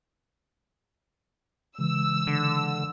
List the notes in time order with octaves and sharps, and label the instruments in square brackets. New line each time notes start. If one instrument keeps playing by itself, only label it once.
[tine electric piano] C#3 E3 G#3 [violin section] E6
[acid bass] D3